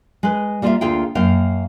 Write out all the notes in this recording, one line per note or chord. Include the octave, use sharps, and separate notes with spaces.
G#3 B4
G3 A#3 F4 D5 E5 F5
D2 A#3 F4 G#4 F5 G5
F#2 A#3 F5 G5